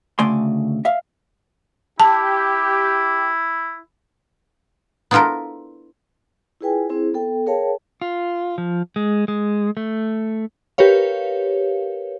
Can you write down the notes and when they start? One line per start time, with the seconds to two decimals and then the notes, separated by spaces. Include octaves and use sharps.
0.19 D2 C#3 A3 D5 G#5 C6
0.85 E5 F5
2.00 E4 G4 A5
5.11 B3 D4 E4 F4 A4 A#4
6.61 E4 F4 G#4 B4 G5 G#5
6.89 C4 E4 G#4 C5
7.14 B3 A4 G5
7.46 G#4 A#4 C#5 F5 G5 A5
8.02 F4
8.58 F3
8.96 G#3
9.28 G#3
9.77 A3
10.78 G4 A#4 B4 C#5 F5